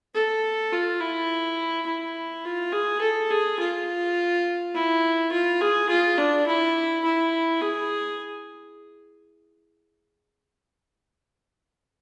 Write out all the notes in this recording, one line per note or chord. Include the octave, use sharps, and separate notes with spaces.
A4
F4
E4
E4
F4
G#4
A4
G#4
F4
E4
F4
G#4
F4
D4
E4
E4
G#4